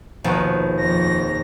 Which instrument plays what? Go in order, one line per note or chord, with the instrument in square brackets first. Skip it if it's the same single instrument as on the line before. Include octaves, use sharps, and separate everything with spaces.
[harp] A#1 D#2 B2
[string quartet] F2 A#6